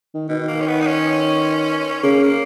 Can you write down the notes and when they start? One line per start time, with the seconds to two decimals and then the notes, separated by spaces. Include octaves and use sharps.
0.14 D#3
0.29 B2 D#3
0.48 A#3
0.61 C#4
0.68 B3
0.81 D#4
0.87 C#4
2.03 C#3 A#3
2.23 A#3